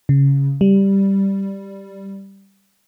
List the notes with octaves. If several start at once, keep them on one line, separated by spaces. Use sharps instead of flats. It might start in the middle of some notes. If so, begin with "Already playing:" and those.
C#3
G3